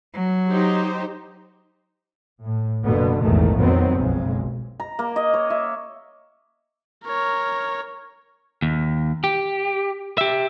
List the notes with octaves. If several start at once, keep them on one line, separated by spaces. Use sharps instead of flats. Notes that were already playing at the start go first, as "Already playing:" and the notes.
F#3
D#4 G4 C5
A2
F#1 B2 D3 A#3 B3
A#1 E2 G#2 D#3 A3
F2 D#3 F#3 B3 C4
F#1 B1 F2 G#3
A#5
A#3
D#5
C#5
E5
A#4 C#5
D#2
G4
G4 E5